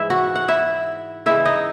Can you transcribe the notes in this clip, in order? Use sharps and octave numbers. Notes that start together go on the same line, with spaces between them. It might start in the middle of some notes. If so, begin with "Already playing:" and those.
Already playing: G#2 E3 G#3 E4 E5
F#4 F#5
F#5
E4 E5
C#3 E3 G#3 E4 E5
D#4 D#5